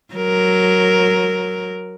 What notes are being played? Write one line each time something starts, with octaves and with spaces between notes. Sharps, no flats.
F#3 A#4